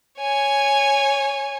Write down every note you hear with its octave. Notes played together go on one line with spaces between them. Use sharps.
C#5 G#5